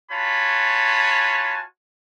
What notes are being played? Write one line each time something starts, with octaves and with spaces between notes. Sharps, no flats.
F4 F#4 C#5 G#5 A5 B5